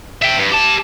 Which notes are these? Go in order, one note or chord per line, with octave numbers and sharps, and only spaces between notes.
E5 G5
G2
G4 A5